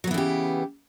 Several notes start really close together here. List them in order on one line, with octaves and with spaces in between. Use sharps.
F#3 B3 E3 C#3 G4